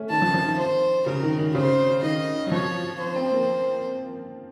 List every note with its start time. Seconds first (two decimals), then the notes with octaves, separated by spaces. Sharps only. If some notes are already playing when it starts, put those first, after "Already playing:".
Already playing: A3 C#4
0.10 D#3 A5
0.22 F3
0.34 F3
0.45 D#3
0.58 C5
1.06 C#3 A#4
1.23 D#3
1.38 D#3
1.54 C#3 C5
2.02 D#3 D#5
2.46 F#3
2.51 F3 C#5
3.00 C5
3.16 C4
3.31 A#3